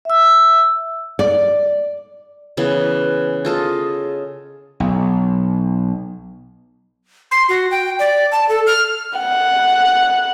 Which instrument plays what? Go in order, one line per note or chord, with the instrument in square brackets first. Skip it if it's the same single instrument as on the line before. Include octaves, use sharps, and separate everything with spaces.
[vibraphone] E5 E6
[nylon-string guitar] D5
[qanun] C#3 E3 B3 [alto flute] B4
[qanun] F4 A4 D#5 [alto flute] G#4
[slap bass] B1
[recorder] C6
F#4
G5
D5
A5
A4
F6
[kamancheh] F#5